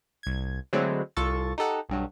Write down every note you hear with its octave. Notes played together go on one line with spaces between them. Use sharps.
C2 G#6
D3 F#3 G#3 A3 C4 E4
C2 F4 A4 C#6 A6
D#4 G4 A4 F#5
B1 G2 F#3